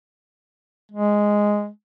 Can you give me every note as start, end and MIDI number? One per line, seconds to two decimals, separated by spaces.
0.92 1.68 56